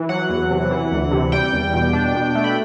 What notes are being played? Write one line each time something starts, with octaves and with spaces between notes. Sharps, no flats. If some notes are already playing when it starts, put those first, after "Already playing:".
Already playing: E3
F#3 F#5
E2
C3
E3
D2
C3
G3 G5
E2
B2
D4
B2
A3
B5